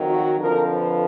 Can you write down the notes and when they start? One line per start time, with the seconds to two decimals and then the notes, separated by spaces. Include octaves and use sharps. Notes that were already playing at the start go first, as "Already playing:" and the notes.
Already playing: F2 D#3 F#3
0.09 F#4
0.39 F2 D3 F3 A#4
0.70 B4